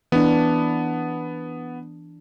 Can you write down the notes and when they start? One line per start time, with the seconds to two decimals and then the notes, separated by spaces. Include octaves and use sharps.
0.12 E3 B3 D4